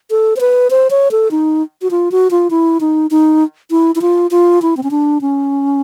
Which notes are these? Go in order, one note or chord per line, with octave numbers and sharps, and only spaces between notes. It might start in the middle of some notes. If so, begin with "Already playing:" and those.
A4
C5
B4
C5
C#5
A4
D#4
F#4
F4
F#4
F4
E4
D#4
D#4
E4
E4
F4
F4
E4
C4
C#4
D4
C#4